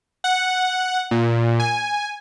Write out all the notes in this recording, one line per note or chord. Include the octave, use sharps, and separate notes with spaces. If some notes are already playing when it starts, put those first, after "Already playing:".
F#5
A#2
G#5